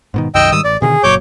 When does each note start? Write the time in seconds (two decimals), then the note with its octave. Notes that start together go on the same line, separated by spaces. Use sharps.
0.14 G#2 B2 D#3
0.35 C2 F#2 D#3 D#5 G5 E6
0.52 G#2 D#3 G3 D#6 E6
0.64 A1 D5
0.82 B2 D3 D#3 G#4
1.03 F#1 A#2 F#3 C#5 D6 G6